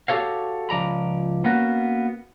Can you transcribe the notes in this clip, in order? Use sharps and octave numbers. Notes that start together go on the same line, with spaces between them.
F#4 G4 A4 C#5 F5
C#2 F3 D5 A#5 B5
A#3 B3 C#4 F#4